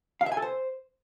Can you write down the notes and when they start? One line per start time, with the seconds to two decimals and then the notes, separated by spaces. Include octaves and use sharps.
0.21 F5
0.26 E5
0.32 G#5
0.37 A4
0.42 C5